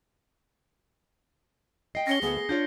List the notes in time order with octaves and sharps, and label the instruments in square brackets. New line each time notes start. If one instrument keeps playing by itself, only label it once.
[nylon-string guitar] D#5 G5 [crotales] C7
[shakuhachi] C#4 [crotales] A#6 C#7 G7
[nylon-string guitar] D2 A3 B3 [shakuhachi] G#4
[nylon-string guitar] B3
[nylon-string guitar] D4 F4 C#5 [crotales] G6